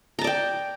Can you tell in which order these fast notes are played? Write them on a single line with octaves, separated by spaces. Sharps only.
A#5 A5 D5 G5